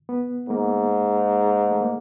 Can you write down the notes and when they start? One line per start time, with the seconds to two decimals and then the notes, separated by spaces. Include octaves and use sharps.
0.09 B3
0.49 G#2 A#3
1.71 A3
1.81 A#3